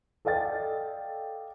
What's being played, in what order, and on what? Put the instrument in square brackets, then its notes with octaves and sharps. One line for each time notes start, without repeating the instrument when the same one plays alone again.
[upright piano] A4 D5 D#5 F5 G5 A6